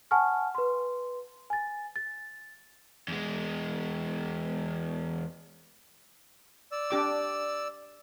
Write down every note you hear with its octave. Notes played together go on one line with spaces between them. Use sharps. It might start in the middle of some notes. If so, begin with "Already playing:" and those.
F#5 G#5 A5 C#6 F6
B4 C6
G#5 A6
A6
E2 G#3
D5 E6
D4 G4 D6